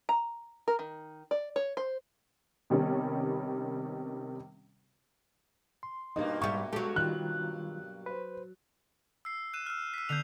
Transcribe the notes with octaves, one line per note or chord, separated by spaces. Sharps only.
A#5
A#4
D#3
D5
C#5
C5
C3 D#3 G3 B3 C#4
C6
G2 B2 A#3 D#4
G#2 G3 E5 C#6
F#3 G#3 G4 A4
D#3 G3 F4 F#6
B4 C5
E6 C7
F#6 D#7 E7
E6 F6
E6 B6
D3 B3 G6 C7 F7